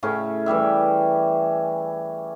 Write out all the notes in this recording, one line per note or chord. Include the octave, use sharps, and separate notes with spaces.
A2 C#3 C#4
E3 G3 G4 E5